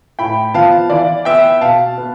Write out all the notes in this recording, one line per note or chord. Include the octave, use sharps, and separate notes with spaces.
A2 G5 B5
F3 B3 F5 A5
E3 D5 F5
B3 E5 G5
B2 F5 A5
B3